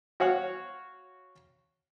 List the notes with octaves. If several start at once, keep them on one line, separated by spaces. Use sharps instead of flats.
F#4 C#5 F5 F#5